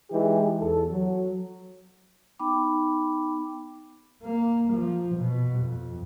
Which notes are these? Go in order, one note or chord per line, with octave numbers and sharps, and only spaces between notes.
E3 G#3 D#4 G4
E2 A4
F#3
B3 D#4 G5 B5 D6
A#3
F3
B2
F2